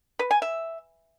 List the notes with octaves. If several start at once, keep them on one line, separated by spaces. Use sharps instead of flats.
B4
G#5
E5